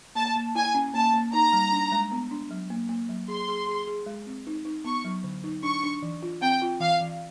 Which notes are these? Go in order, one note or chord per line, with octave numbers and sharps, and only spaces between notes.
A#3 A5
A#3
E4 G#5
C#4
A#3 A5
A#3
D#4 A#5
G3
D4
G#3
B3
D4
F#3
A#3
A#3
F#3
G#4 C6
G#4
G#4
G#4
G#3
C4
D#4
D#4
B3 C#6
F#3
D3
D#4
D4 C#6
D4
E3
F4
C4 G5
F4
E3 F5
E3